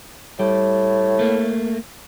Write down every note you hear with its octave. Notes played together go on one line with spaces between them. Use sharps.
A2 G3
A3 A#3